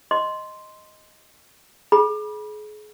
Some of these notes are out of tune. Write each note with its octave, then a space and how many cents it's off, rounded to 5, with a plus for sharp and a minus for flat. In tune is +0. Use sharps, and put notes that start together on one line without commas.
D#5 +0 C6 +0
G#4 +35 B5 -30